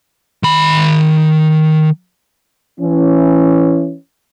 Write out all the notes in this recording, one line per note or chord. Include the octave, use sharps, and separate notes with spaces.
D#3 B5
E3 C#4